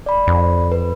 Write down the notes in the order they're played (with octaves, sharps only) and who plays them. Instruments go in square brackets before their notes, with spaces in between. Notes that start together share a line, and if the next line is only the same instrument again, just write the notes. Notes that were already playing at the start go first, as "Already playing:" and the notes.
[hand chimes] D5 B5
[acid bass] F2
[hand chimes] B4